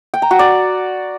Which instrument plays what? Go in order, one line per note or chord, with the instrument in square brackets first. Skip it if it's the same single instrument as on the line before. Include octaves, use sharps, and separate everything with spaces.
[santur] G5
A#5
F#4
D5